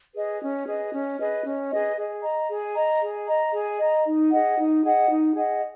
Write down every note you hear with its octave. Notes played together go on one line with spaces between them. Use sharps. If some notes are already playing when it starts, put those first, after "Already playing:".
G#4 B4 D#5
C#4
G#4 B4 D#5
C#4
G#4 B4 D#5
C#4
G#4 B4 D#5
G#4
D#5 A#5
G#4
D#5 A#5
G#4
D#5 A#5
G#4
D#5 A#5
D#4
G#4 D#5 F#5
D#4
G#4 D#5 F#5
D#4
G#4 D#5 F#5